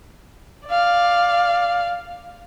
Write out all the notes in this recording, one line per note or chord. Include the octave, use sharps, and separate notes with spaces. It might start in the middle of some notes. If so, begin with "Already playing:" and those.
D5 F5